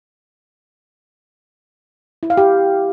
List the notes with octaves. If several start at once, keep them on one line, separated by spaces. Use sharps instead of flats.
E4
F5
G4